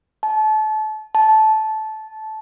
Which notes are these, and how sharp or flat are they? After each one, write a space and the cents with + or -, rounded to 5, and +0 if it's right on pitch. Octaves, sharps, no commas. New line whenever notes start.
A5 -30
A5 -15